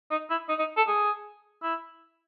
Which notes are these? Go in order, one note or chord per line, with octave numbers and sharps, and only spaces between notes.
D#4
E4
D#4
D#4
A4
G#4
E4